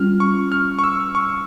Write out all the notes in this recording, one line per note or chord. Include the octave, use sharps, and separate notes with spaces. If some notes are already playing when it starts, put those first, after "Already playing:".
Already playing: G3 C#4 F4 F6
C#6
F6
C#6
E6
C#6